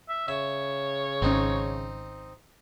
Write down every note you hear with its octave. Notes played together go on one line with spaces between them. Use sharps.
E5
C#3 C#5 E5
G#1 C4 C#4 D#4